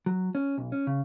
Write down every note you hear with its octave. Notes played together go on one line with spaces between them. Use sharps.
F#3
C#4
B1
C#4
C#3